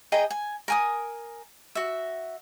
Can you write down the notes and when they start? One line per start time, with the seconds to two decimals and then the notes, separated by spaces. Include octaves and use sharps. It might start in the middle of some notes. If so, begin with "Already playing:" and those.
0.12 G#4 D#5 G5 A#5
0.31 G#5
0.68 A#4 G#5 D#6
1.75 F#4 E5